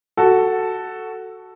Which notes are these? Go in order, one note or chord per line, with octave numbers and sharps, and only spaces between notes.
F#4 A4